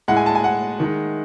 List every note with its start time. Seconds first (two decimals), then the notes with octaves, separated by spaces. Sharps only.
0.08 A2 G#3 F#5
0.17 G#5
0.26 A5
0.35 G#5
0.44 F#5
0.80 D#3 G#3